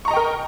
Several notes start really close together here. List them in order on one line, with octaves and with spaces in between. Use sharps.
C#6 A#5 D#5 G5 A#4